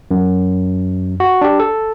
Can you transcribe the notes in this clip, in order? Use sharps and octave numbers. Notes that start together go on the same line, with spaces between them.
F#2
F#4
D4 G4
A4